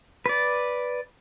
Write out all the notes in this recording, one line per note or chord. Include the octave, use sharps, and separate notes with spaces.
B4 D5